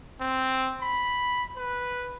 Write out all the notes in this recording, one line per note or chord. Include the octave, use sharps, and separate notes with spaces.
C4
B5
B4